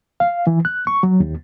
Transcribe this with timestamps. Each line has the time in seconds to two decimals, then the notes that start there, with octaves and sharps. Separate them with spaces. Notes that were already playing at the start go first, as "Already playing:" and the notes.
0.20 F5
0.47 E3
0.65 F#6
0.87 C#6
1.03 F#3
1.20 D#2